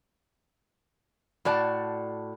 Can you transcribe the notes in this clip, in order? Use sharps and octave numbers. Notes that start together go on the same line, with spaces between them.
A2 F#4 D5 A5